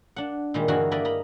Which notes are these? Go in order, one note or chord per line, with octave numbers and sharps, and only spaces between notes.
D4 F#5
A#2 D#3 G3 G#3
G2 D3 E3 F#4 G#4 A#4
A#3 E4 A#4 B4 D5 D#5
D#5 A#5 B5